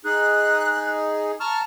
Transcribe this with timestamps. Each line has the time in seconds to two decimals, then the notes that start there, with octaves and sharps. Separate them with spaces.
0.05 D#4 G#4 F#6
1.40 A5 A#5 C#6 F6